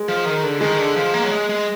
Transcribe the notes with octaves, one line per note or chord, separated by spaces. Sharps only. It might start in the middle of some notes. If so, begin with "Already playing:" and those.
Already playing: G#3
F3
D#3
D3
D#3 G#3
D3
F3
A#3
F#3
G#3
G#3